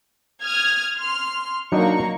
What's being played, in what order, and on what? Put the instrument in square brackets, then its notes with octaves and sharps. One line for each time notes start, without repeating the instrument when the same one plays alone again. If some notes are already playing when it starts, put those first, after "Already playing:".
[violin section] D#6 F6 G#6
C6 F6
[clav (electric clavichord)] F#3 D4 D#4 [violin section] A#3 C#6